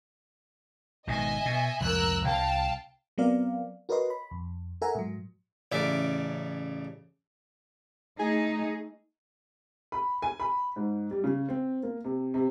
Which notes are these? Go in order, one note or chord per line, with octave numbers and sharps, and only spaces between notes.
G#1 B2 D#3 D#5 E5 G#5
B2
C2 F2 G#2 A#4 E6 F#6
C2 F5 G5 A5
F#3 B3 C4 A#4 D5 F5
F#4 A#4 B4 C#5 D#5 C6
B5
F2
A4 A#4 E5 F#5 G#5 A#5
G#2 F#3
A1 C#3 D5 E5
A3 D#4 G#4
B5
G#5
B5
G#2
G3
C#3
C4
A#3
C3
C3